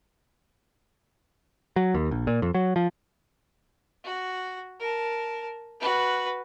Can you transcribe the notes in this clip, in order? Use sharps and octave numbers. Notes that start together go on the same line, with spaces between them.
F#3
D#2
A#1
A#2
F2
F#3
F3
F#4
A#4 A5
F#4 B4